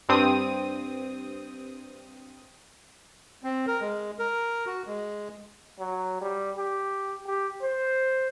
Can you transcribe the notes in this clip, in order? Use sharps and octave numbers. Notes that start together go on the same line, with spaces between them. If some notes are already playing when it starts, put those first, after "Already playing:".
G2 C4 D#6
C4
A#4
G#3
A#4
F#4
G#3
F#3
G3
G4
G4
C5